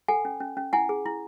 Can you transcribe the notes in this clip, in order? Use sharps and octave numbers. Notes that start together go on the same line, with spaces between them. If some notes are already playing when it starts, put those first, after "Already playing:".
A4 F#5 G#5
C#4
C#4
C#4
E4 F#5 G#5
G#4
E4